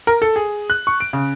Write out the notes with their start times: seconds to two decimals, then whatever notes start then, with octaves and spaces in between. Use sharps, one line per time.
0.07 A#4
0.22 A4
0.36 G#4
0.70 F#6
0.87 C#6
1.00 D7
1.13 C#3